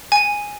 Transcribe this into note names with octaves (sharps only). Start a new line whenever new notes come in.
G#5